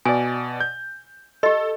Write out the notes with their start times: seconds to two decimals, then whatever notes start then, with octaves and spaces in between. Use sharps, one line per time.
0.05 B2 D5 G#5
0.60 G6
1.43 G4 A4 D#5